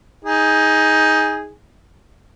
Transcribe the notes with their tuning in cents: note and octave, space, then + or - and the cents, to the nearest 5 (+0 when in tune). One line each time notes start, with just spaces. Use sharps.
D#4 +15 G#4 -5